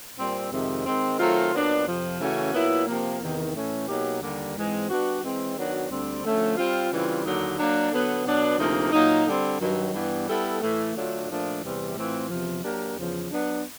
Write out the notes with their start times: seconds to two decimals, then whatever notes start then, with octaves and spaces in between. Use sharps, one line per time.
0.18 A#2 G3 C4
0.51 F2 C3 D#3 G#3 C4
0.86 D#3 G#3 C4
1.18 D#3 F#3 A3 C4 F4
1.53 A#2 F#3 B3 D4
1.86 F2 C3 F3
2.20 C#3 E3 A3 C#4 F#4
2.53 A#2 F#3 B3 E4
2.87 C3 F3 A#3
3.21 E2 C3 D#3
3.55 A2 E3 A3 C#4
3.88 B2 F#3 A#3 D#4 G4
4.21 D#2 D3 G3 A#3
4.55 G#2 E3 G#3 C4
4.89 G3 B3 D4 F#4
5.22 E3 G#3 C4
5.56 D#3 F#3 B3 D4 F#4
5.90 D2 D3 G3 C4
6.23 D3 F3 A3 C#4
6.57 G3 C4 F4
6.91 C#3 E3 G3 C4 F4
7.25 D#2 D3 F#3 A#3 D#4
7.58 F#3 A#3 D4
7.92 D3 F#3 B3
8.25 B2 F#3 B3 D4
8.59 D2 C3 F3 A#3 D#4
8.92 A#2 F#3 A#3 D#4
9.27 D3 G3 C4
9.60 G2 D#3 F#3
9.94 G2 E3 G3 B3
10.27 G3 B3 E4 A4
10.61 A2 E3 A3
10.94 D3 F#3 A3 D4 F4
11.28 A#2 F3 A3 D4
11.62 E2 C3 E3 G3 C4
11.95 A2 E3 A3 C4 F4
12.29 E2 C3 F3
12.63 F#3 A#3 D4 G4 A#4
12.96 E2 C#3 F3
13.30 F#3 B3 D4